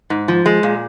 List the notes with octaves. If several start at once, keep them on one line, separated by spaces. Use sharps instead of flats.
G#2
F3
G#3
A#2